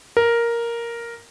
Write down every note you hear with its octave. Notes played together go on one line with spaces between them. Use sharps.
A#4